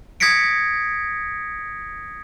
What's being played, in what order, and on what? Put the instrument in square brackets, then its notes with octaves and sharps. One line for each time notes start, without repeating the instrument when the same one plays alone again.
[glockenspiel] D#6 G#6 A#6 B6 C#7 D7